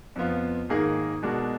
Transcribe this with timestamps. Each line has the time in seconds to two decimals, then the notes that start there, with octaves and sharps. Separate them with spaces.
0.16 F2 F3 B3 F4
0.69 G#2 D#3 A#3 D#4 G#4
1.23 B2 G#3 D4 F#4 A#4